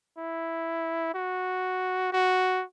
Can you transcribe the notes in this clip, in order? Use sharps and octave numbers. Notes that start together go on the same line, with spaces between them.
E4
F#4
F#4